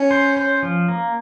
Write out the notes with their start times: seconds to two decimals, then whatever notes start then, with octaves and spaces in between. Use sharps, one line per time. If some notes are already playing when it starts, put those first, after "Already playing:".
Already playing: C#4
0.11 C5
0.37 C5
0.63 F3
0.88 A#3